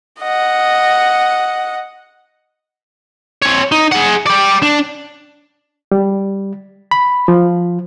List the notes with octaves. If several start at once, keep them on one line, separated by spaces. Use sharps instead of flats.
D#5 F#5
C4 C#5
D#4
G#4 F#5
G4 D5
D4
G3
B5
F3